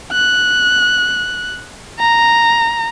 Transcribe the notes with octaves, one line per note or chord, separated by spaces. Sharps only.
F#6
A#5